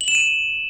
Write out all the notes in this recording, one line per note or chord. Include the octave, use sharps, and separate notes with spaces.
F#7
E7
D#7